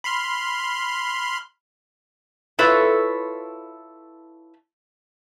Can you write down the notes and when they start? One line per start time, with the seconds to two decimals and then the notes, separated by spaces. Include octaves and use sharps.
0.04 B5 C6 F6
2.59 E4 F4 A4 B4 C#5